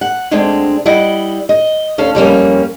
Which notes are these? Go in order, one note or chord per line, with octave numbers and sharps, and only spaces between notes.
F#5
D2 D3 G#3 C4 D4
G3 E4 D#5 F#5
D#5
D2 C#4 A4 F5
F2 G3 A#3 C#4